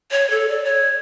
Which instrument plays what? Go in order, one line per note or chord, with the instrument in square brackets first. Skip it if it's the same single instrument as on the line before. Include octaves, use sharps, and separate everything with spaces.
[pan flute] C#5
A4
D5
C#5